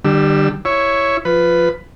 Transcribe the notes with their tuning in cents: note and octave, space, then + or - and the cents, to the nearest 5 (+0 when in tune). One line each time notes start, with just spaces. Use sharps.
D3 +40 G3 +0 E6 +0
E4 +5 C#5 +0
F3 +0 B4 +10